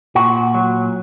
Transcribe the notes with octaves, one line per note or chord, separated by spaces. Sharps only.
A#2 F#4
F#3